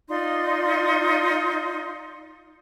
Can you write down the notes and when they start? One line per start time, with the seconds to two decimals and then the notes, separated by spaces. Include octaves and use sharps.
0.08 D#4 F4 D5 C6